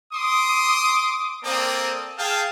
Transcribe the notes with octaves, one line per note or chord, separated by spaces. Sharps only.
C6 D6 D#6
A#3 C4 A4 D5 D#6
G#4 F5 G5 A5